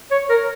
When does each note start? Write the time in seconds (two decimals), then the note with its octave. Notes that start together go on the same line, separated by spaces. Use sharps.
0.11 C#5
0.30 A#4